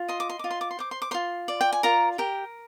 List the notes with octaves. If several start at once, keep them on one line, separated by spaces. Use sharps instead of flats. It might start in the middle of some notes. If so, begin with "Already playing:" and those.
Already playing: F4
D#5 C6
D6
C6
F4 D6
C6
D6
C6
C5 D6
C6
D6
F4 C5 C6
D5
G5
G#5
F4 A#4 A#5
G4 A#4 G5